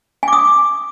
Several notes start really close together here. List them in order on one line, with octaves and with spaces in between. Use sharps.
G#5 D6 D#6